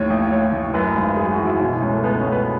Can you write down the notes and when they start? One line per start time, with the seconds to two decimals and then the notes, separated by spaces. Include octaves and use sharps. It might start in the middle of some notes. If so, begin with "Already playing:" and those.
Already playing: D#2 A2 C#5
0.10 A1
0.31 A1 C#5
0.52 A1
0.74 F#2 B4
0.96 G#1
1.17 F#2 G#4
1.32 F#4
1.39 E3
1.46 E4
1.60 B2 E4
1.82 C#2 C#4
1.93 A3
2.03 C#2 B3
2.18 C#4
2.25 C#2
2.32 B4